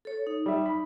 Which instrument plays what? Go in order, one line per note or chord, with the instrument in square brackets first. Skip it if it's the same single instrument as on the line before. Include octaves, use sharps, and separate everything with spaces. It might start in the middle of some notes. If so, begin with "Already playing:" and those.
[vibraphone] A4 C#5
D#4
[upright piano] G3 E5
B5